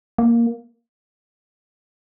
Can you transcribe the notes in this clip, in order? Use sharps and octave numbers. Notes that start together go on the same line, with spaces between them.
A#3